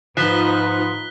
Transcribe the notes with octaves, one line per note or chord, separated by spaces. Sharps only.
G#2 F3 D#4 F4 B4 F#6 B6 G7